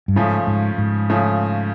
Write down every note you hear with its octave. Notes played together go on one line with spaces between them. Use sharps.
G2
G#2 C#3 F3 A3
G#2
G#2
C#3 F3 A3